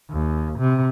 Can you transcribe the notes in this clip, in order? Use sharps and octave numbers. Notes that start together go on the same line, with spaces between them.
D#2
C3